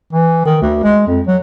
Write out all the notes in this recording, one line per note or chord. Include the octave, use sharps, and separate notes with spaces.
E3
D#3
D2
G#3
F2
F#3